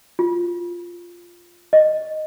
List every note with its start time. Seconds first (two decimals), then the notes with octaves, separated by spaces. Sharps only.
0.19 F4
1.73 D#5